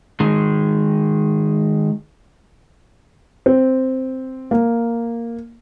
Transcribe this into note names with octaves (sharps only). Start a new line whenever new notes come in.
D#3 G#3
C4
A#3